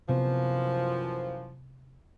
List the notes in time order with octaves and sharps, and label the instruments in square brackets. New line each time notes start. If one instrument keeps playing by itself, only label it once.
[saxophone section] F#2 E3 F3 [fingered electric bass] C3 B3